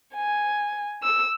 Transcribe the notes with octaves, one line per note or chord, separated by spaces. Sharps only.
G#5
E6